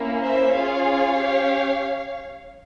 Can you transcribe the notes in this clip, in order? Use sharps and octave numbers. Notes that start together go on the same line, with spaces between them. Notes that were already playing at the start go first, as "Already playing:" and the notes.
Already playing: A#3 C#4 E4
C5 E5
C#4 F4 G#4 C#5 F5
C#4 G4